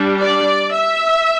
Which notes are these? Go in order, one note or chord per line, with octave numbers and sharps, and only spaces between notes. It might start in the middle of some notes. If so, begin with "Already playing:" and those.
Already playing: G3 D4
D5
E5